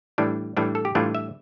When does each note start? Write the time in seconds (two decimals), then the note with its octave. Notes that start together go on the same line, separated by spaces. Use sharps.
0.18 A2 E3 G3 D4
0.57 A2 E3 G3 D4
0.75 A4
0.85 G4
0.95 A2 E3 G3 D4 F4
1.15 E5